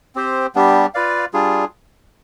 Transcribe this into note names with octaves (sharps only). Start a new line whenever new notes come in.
C4 G4 C5
G3 B3 D4 G4
F4 B4 D5 F5
G3 D4 F4 G#4